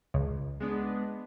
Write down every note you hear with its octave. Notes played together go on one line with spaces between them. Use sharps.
C#2
G#3 B3 D4